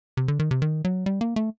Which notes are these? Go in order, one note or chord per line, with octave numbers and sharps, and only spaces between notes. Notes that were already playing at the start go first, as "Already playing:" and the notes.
C3
D3
D#3
C3
D#3
F#3
G3
A#3
A3